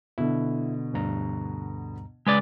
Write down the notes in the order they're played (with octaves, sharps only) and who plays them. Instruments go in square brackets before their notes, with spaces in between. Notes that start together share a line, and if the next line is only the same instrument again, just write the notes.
[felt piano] B2 D3 [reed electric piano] E4
[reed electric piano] D2 G2 A#5
[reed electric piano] C#3 [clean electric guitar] G#3 B4 D5